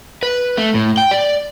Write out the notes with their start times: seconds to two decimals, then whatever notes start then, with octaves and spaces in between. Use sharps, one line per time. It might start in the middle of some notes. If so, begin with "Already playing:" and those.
0.23 B4
0.57 A3
0.74 A2
0.97 G5
1.11 D5